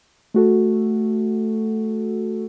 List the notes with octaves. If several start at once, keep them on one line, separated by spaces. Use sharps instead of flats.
A3 F#4 A4